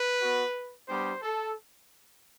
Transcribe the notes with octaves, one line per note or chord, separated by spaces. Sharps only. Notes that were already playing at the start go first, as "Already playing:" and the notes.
Already playing: B4
B3 F#4
G3 B3 D4 G4 C5
A4